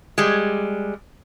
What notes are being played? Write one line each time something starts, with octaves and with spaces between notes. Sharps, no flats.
G3 G#3